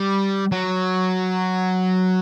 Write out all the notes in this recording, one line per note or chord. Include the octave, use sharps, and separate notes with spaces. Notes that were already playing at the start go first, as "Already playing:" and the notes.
Already playing: G3
F#3